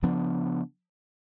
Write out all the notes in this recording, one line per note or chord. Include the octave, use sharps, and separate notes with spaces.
C#3 F3 B3 D4